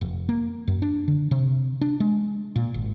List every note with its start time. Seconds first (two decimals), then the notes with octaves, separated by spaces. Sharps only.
0.01 F1
0.29 A#3
0.68 F#2
0.82 D4
1.08 D3
1.31 C3
1.81 D4
2.00 G#3
2.56 A#2
2.74 G#1